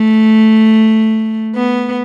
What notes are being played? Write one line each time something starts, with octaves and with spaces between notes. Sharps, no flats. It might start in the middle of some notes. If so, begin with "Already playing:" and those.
Already playing: A3
B3